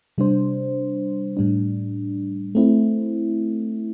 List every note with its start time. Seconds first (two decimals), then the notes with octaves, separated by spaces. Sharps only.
0.18 C3 G3 D4 C5
1.37 A2 G3 D4
2.55 A3 C4 E4